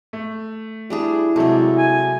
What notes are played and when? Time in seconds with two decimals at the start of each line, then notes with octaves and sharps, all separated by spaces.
0.13 A3
0.90 G3 D4 E4 G#4
1.36 C3 F#3 G#3 A3 A4
1.77 G#5